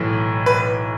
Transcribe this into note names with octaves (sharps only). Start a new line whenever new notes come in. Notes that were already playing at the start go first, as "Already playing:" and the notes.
Already playing: B1 A2 E3
B4